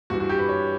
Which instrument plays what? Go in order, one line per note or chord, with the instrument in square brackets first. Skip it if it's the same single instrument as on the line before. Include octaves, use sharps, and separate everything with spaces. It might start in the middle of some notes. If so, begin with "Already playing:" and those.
[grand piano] G2 E3 F#4
F#4
G4
B4
C#5